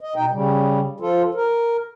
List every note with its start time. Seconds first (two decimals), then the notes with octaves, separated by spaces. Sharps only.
0.01 D#5
0.16 B2 D#4 G5
0.31 C#3 G3
1.00 F3 F4 A4
1.35 A#4